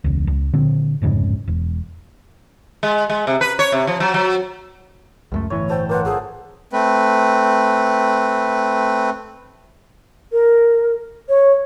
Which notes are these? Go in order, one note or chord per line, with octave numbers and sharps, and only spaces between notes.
E1 C#2
C#2
A#2 D3 C4
D1 F2 G#2 C#3
E1
G#3
G#3
C3
B4
C#5
C3
F3
F#3
F#3
C#2 F#2 A3
G1 A2 E3 C#5
A3 A4 C5 G5
A#3 B4 C5 F#5
G#1 F3 A3 G#4
A3 C4 B4
A#4
C#5